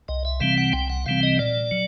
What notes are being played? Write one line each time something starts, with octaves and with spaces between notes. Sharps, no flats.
C2 D#5
E5
C3 E3 G3 C4 F5
F#5
C2 G5
F#5
C3 E3 G3 C4 F5
D#5
A#2 D5
F#3